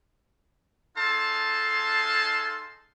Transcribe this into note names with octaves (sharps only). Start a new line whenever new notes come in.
D#4 G#4 A4 F5 A5 C6